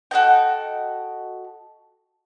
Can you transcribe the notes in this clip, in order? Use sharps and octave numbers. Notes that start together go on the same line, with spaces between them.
F#4 A4 D#5 G5